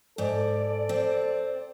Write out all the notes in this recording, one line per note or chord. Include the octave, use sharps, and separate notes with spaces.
G#2 A4 D5
C4